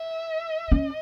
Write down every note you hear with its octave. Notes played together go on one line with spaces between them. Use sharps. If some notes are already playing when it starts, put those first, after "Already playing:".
Already playing: E5
C#4 D#5